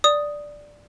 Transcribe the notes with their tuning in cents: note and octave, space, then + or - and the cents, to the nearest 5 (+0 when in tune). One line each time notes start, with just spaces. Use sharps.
D5 +0 D#6 +0